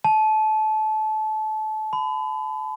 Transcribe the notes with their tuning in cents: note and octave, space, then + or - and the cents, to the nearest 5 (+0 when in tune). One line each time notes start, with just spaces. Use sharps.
A5 -25
B5 +30